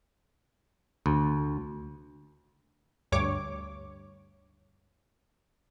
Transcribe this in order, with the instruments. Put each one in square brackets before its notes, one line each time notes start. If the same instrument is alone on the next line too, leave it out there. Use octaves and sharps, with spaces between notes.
[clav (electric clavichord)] D2
[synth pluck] D2 G2 C#5 D6